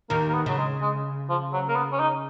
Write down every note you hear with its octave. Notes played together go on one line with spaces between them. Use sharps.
D#2 D#3 A#3
A#3
B3
C#3 F#3
G#3
G#3
F3
F#3
A#3
B3
C#4
D#4